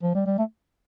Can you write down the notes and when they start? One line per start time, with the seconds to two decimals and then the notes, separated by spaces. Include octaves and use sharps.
0.02 F3
0.15 G3
0.26 G3
0.38 A3